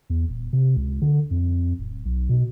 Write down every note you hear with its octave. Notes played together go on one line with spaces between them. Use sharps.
E2
D#1
C3
C#2
D3
F2
D1
B1
B2